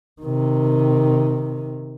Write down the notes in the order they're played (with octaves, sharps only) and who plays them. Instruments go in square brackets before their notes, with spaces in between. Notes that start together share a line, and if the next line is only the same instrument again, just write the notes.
[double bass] C3 D#3